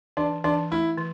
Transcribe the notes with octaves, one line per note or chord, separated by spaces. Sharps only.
E3 D4
E3 D4
A3 E4
E3